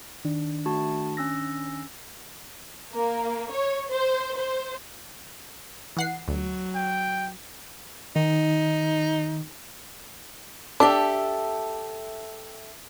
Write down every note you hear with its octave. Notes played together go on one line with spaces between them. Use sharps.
D#3 D4
A3 F#4 A5
C#4 E6 A#6
A#3
C#5
C5
C5
E3 F#5 C7
D2 F#3
G5
D#3 D#4
D4 G4 A4 E5